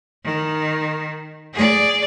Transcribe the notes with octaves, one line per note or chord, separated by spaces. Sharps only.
D#3
G#4 D5